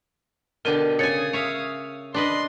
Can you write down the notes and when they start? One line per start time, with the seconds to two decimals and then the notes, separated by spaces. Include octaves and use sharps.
0.65 B2 D3 G4 A#4 D#7
0.99 C#3 G#5 D#6 A6 C#7
1.33 C#5 E5 F5
2.14 D4 B4 D#5 C6